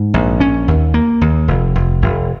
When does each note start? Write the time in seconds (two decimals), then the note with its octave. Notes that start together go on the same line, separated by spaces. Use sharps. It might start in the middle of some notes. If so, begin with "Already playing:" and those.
Already playing: G#2
0.14 A#1
0.40 C#4
0.68 D#2
0.94 A#3
1.21 D#2
1.48 F1
1.75 F1
2.02 F1